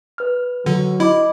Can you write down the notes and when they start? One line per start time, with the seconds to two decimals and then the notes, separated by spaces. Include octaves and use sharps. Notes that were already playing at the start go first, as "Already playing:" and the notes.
0.18 B4 F6
0.66 D3 F#3
1.00 E4 D#5 B5 D6